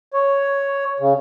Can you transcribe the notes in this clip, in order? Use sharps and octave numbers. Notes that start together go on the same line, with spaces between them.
C#5
C#3